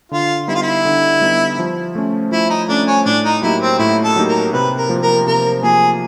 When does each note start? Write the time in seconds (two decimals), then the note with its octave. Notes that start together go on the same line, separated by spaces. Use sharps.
0.11 D3 F4
0.48 G3 B3 D#4 E4
0.55 F4
0.62 E4
0.85 D3
1.21 G3 B3 D#4
1.58 F3
1.95 A3 C#4
2.31 F3 E4
2.50 D#4
2.69 A3 C#4 D4
2.87 C#4
3.05 A2 D4
3.24 D#4
3.42 F#3 A#3 D#4 E4 G4
3.61 C4
3.79 A2 E4
4.04 A4
4.16 F#3 A#3 D#4 G4
4.28 A#4
4.53 C3 B4
4.77 A#4
4.89 F3 A#3
5.02 A#4
5.27 C3 A#4
5.63 F3 A#3 G#4